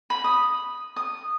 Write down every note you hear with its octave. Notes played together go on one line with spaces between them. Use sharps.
B5
D#6
D#6